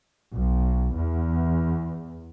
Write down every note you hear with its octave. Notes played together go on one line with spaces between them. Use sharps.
B1
E2